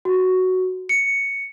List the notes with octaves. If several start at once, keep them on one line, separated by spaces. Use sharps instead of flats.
F#4
C#7